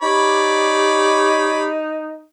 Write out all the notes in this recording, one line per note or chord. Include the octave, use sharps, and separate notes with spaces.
D#4 G4 C#5 D5 B5